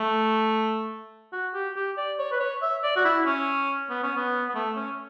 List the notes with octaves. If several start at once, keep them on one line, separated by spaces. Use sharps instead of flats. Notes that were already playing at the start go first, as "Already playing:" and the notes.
Already playing: A3
F#4
G4
G4
D5
C#5
B4
C#5
E5
D5
F#4
E4
C#4
B3
C#4
B3
B3
A3
C#4